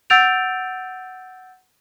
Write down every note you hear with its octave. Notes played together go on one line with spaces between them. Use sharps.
F#5 E6 G6 A6 D7 F7